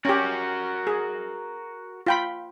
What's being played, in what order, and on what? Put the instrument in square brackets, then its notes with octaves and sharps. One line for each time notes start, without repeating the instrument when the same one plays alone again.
[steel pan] C#4 G4 [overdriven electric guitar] F#4 A#4
[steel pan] G#4
F4 G5 B5